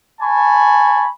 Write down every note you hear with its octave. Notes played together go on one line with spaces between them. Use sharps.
G#5 A5 B5 C#6